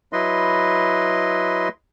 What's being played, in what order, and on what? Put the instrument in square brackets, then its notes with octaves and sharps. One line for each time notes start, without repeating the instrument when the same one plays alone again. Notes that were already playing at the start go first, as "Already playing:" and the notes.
[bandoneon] F#3 E4 B4 D#5 C6